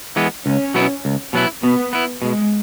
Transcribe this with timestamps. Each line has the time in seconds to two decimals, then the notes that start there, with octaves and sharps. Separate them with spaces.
0.16 E3 G#3 B3
0.46 C#2 C#4
0.74 B2 F#3 B3 E4
1.05 C#2
1.33 B2 F#3 B3 E4
1.63 B2 B3
1.93 B3 E4
2.22 B2 G#3